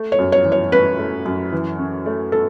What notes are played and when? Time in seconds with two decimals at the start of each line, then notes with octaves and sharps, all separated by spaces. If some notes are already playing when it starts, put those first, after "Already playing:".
Already playing: A3
0.12 C#5
0.19 F#2
0.32 C#5
0.45 E3
0.52 C#5
0.72 C#4 B4
0.99 A3
1.25 F#2
1.52 E3
1.79 C#4
2.06 A3
2.32 A4